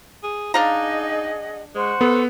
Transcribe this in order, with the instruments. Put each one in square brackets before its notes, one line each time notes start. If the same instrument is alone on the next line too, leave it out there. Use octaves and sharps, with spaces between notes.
[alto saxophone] G#4
[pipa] D4 F5 A#5 [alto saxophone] D#4 [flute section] G#4 D#5 F#5
[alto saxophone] G#3 [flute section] C5 F#5 C#6
[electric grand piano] B3 [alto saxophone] A4